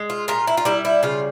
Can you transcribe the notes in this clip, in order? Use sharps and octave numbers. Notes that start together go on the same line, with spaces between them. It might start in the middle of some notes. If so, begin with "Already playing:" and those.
Already playing: G#3
F4
A#2 F4
E4
F4
G3 E4
E4
C#3 F4